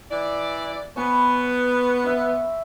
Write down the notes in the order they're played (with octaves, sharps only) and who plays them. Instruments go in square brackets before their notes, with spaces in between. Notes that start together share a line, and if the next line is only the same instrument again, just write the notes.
[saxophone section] E3 D5
[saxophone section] B3 [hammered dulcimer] C#5 G#5 B5
[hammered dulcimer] E5 C6